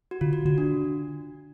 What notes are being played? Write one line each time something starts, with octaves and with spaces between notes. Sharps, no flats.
F#4
D3 F4
F#4
D3 F#4
D4